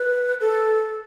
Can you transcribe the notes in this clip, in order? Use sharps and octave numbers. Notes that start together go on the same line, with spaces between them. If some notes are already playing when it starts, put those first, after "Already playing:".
Already playing: B4
A4